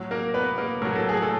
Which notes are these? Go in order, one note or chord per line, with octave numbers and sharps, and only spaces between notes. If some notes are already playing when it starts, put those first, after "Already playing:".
Already playing: A2 F#3
A#3 A#4
B3 B4
A#3 A#4
A2 F#3 A#4
A4
G#4
A3 A4